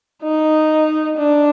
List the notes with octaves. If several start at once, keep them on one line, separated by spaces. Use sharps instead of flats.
D#4
D4